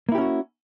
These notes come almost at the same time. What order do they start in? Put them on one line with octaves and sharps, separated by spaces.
A#3 E4 G4 C#4 F#4